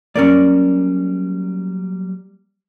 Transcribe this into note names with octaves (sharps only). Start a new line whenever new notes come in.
F#3 G3 A#3 C#4 A#4 D5